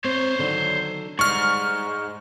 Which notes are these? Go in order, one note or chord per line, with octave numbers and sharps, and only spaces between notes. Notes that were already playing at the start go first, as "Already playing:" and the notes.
C4 C5 C#5
D3 D#3 F#3
G#2 G3 C#6 F6